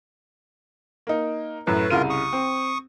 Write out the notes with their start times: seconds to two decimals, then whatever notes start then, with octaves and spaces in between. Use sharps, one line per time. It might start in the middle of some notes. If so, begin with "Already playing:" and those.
1.07 A#3 D#4
1.67 F#2 A2 B4
1.90 C2 C#3 F4 A#4 D#7
2.10 C#6 D#6
2.33 C4